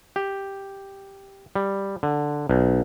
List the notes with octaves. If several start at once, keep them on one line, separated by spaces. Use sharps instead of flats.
G4
G3
D3
B1